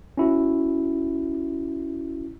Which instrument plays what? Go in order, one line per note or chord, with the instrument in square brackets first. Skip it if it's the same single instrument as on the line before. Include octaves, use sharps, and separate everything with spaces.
[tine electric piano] C#4 E4 F#4